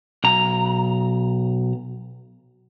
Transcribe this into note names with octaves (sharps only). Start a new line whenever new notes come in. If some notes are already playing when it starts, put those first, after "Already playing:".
B1 A#5